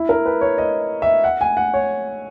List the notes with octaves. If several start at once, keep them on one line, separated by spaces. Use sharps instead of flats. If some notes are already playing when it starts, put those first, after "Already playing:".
Already playing: E4
A#4
B4
C#5
D#5
E5
F#5
G#5
F#5
C#5